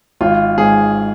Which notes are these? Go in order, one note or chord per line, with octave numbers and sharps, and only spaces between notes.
G#1 F4
G#2 G#4